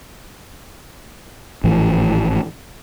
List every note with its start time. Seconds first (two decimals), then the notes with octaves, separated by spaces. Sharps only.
1.64 G#1 A2 E3 F3